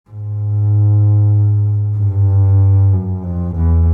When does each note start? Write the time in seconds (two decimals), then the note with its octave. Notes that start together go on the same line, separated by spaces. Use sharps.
0.10 G#2
1.98 G2
2.92 F#2
3.24 F2
3.56 E2